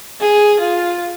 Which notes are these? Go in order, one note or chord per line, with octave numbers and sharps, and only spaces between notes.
G#4
F4